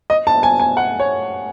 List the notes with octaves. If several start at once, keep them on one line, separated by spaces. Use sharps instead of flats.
D#5
A5
G#5
G#5
F#5
C#5